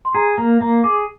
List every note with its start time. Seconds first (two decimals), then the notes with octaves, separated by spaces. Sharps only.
0.05 C6
0.15 G#4 A#5
0.37 A#3 A#5
0.61 A#3 A#5
0.83 G#4 D6